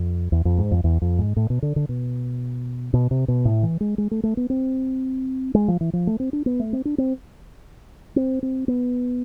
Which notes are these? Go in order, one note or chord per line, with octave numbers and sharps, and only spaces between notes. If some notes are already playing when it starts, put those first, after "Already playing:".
Already playing: F2
E2
F2
G#2
F2
E2
F2
G#2
A2
B2
D3
D3
B2
B2
C3
B2
A2
E3
G#3
G#3
A3
A3
B3
C4
G#3
F3
E3
F3
A3
C4
D4
B3
A3
C4
D4
C4
C4
C4
B3